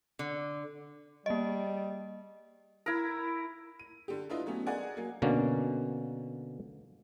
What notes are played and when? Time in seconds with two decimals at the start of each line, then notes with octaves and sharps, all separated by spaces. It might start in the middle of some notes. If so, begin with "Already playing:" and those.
0.19 D3
1.26 G3 A#3 D#5
2.86 E4 A#4
3.79 D#7
4.08 D3 G4
4.30 D4 E4 F4 B4 D#5 E5
4.46 F#3 A3 B3 C#4
4.67 G#4 A#4 D5 D#5 F#5 G#5
4.97 F#3 A#3
5.22 B2 D3 A#3 C#4